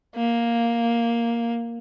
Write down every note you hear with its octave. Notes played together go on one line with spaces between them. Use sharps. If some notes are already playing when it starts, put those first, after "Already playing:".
A#3